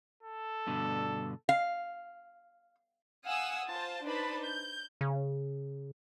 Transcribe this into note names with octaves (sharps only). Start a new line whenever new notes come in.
A4
G2 B2 D3
F5
F5 F#5 G#5 D#6 E6
F4 C5 A5
D4 D#4 B4 C5 A5 B5
G6
C#3